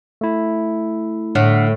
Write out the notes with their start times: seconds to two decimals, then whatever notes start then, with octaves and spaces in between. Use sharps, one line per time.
0.21 A3 E4
1.35 A2 D3 F#5 F6